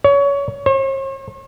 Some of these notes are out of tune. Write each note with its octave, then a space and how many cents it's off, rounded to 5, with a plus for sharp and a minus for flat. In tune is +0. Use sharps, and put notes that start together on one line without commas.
C#5 +25
C#5 -45